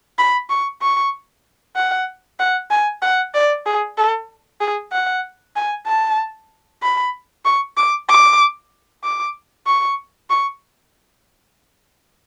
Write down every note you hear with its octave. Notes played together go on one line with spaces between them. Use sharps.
B5
C#6
C#6
F#5
F#5
G#5
F#5
D5
G#4
A4
G#4
F#5
G#5
A5
B5
C#6
D6
D6
D6
C#6
C#6